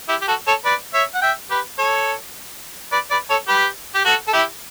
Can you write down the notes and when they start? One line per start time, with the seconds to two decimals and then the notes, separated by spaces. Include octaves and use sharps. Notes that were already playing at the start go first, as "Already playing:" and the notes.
0.09 E4 G4
0.21 G4
0.28 F#4 A4
0.47 A4 C#5
0.65 B4 D5
0.94 C#5 E5
1.14 F#5
1.22 E5 G5
1.50 G4 B4
1.79 A4 C#5
2.92 B4 D5
3.11 B4 D5
3.30 A4 C#5
3.48 G4 B4
3.95 G4
4.05 F#4 A4
4.27 A4
4.33 E4 G4